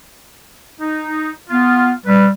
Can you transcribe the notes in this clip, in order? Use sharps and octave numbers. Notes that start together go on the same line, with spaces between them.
D#4
B3 F4
G3 B4